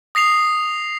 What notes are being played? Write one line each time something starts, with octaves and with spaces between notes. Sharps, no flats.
D#6 A#6 C7 F7